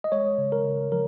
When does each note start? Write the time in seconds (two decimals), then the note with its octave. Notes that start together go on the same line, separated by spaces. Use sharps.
0.04 D#5
0.12 G#3 C#5
0.38 C#3
0.52 A#4
0.65 C#3
0.92 F3 A#4